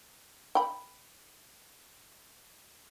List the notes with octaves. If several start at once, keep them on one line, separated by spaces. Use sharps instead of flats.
G5 B5